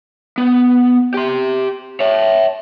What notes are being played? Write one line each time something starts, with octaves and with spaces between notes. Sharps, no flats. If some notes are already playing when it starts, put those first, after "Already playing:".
B3
G4 C6
C#5 E5